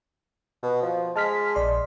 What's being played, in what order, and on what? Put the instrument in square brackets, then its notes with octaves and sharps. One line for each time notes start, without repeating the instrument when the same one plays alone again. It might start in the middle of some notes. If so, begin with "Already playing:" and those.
[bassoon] B2
F3
[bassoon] G#3 [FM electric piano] A5 F6 B6
[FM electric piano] A#1 D5 C6